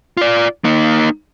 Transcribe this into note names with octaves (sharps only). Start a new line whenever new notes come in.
F4 D5
A#3 D#4